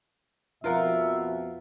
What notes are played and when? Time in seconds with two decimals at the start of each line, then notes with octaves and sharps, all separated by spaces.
0.64 F2 B2 F4 A#4 E5 F#5